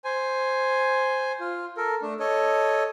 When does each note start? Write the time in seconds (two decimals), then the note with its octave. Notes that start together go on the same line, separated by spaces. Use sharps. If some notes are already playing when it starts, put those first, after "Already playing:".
0.04 C5 G#5
1.40 F4
1.77 A4 A#4
2.02 A3 D4
2.20 A4 C#5 D#5